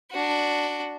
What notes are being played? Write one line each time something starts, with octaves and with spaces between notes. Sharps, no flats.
D4 F#4